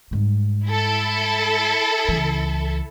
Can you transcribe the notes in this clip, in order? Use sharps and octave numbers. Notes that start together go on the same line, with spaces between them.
G#2 G3
E4 A4
C#2 E3